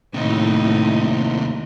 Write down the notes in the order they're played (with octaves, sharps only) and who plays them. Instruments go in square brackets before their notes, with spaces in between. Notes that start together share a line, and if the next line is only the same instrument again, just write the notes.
[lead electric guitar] D#2 C3 [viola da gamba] A2 D#4